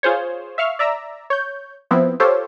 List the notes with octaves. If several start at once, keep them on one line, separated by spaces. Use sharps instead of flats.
F4 G#4 C5 C#5
E5 F5 C#6 F6
D5 E5 A#5 E6
C#5 G6
F3 B3 C4 E4
F4 G4 A4 C5 C#5